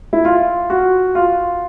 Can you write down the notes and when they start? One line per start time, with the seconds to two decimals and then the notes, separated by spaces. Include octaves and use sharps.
0.13 E4
0.25 F4
0.70 F#4
1.15 F4